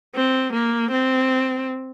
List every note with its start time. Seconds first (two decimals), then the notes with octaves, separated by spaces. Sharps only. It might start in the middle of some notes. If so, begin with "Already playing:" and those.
0.15 C4
0.53 A#3
0.91 C4